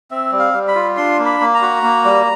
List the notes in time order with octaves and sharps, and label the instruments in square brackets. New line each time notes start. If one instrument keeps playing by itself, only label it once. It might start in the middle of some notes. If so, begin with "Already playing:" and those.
[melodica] C4 E5
G3
F5
G3
B5
F4
D4 C6
A#3
B5
A#3
A#5
F#4
A#3
G3